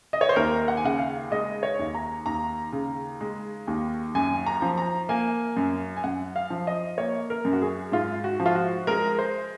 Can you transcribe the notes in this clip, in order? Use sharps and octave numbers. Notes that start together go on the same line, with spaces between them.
D#5
C#5
C5
D#2 A#4
F#5
G#5
C#3 F#5
F5
G#3 D#5
C#5
D#2
A#5
D#2 A#5
C#3
G#3
D#2
F#2 G#5
A#5
F3
A#5
A#3 G#5
F#2
G#5
F#2 F#5
F5
F3
D#5
A#3 C#5
A#4
F#2
F#4
G#4
G#2 F4
F#4
F3
F4
F#4
G#3 A#4
C5